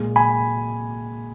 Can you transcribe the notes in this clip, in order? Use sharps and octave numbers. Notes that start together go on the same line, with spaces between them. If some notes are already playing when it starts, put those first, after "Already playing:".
Already playing: A#2 G#3
G#5 B5